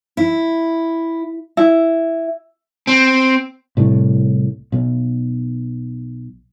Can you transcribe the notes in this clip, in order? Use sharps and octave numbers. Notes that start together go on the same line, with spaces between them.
E4
E4
C4
C2 A2
B1